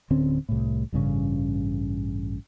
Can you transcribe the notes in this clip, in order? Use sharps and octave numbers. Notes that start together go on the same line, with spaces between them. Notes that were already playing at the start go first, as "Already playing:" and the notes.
D1 D3 C4 C#4
C2 A2
A1 G2 C#3 C#4